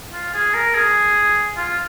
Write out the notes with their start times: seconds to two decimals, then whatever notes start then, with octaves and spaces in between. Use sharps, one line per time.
0.13 F4
0.34 G#4
0.54 A#4
0.75 G#4
1.57 F4